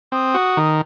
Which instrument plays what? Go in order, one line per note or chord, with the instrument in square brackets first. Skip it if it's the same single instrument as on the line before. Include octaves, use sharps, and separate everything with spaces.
[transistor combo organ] C4 [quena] D#6
[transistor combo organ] F#4
D#3